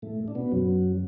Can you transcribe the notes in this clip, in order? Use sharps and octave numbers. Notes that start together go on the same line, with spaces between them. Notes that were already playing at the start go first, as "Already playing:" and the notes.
A2 A3
D4
B2 B3
F#2 F#3